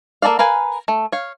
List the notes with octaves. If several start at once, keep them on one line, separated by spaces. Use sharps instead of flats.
A#3 D#4 A4 D5 F5
A#4 B4 F5 G#5
A3
C#5 F5